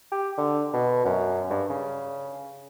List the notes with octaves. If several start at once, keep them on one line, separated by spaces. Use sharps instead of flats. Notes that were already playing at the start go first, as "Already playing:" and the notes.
G4
D3
B2
F#2
G2
C#3